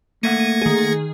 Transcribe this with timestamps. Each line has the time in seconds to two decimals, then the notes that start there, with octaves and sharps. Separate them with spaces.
0.23 A3 A#3 E5 F#5 G#6 A#6 C#7 D#7
0.62 D#3 G#4